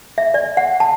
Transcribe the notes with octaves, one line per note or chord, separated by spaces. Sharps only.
E5
D5
F#5
A5